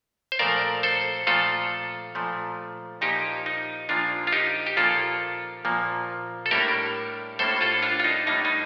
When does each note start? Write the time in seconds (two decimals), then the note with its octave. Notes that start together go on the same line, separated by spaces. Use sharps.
0.32 C5
0.39 A#2 F3 A3 A#4 D5
0.83 A4 C5
1.27 A#2 F3 A3 F4 A4
2.15 A#2 F3 A3
3.01 A#2 F3 A#3 D#4 G4
3.46 D#4
3.89 A#2 F3 A#3 D4 F4
4.27 F4
4.33 D#4 G4
4.66 G4
4.77 A#2 F3 A#3 F4 A4
5.65 A#2 F3 A#3
6.46 A4
6.51 A2 G3 A#3 D4 G4 A#4
7.39 A2 G3 A#3 D4 A4 C5
7.61 F4 A4
7.82 D4 F4
8.00 F4
8.04 D#4
8.27 A2 G3 A#3 D4 D#4
8.45 D#4